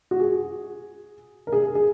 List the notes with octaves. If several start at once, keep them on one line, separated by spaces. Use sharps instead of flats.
F#4
G#4
A#4
G#4
G#4
G#4